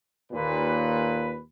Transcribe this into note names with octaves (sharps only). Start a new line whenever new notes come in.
D#2 A#2 B4